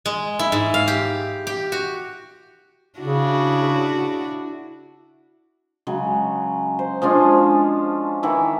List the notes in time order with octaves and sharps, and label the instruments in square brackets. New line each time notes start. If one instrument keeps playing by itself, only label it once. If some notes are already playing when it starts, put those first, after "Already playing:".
[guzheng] G#3
E4
G#2
F5
G4
G4
F#4
[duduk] C#3 [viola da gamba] D4 E4 F#4
[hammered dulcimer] C#3 F#3 G#3
C5
F3 G#3 C#4 D4
D#3 E3 E4